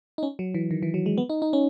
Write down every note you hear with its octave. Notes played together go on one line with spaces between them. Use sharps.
D#4
C#4
F#3
E3
D#3
E3
F#3
G#3
B3
D#4
D#4
C#4